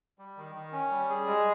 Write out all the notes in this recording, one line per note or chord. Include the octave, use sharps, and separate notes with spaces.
G3
D#3
D#3
C#4
G3
G#4
G#3